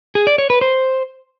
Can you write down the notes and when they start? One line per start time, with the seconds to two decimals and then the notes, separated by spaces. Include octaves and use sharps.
0.15 G#4
0.27 D5
0.38 C#5
0.50 B4
0.61 C5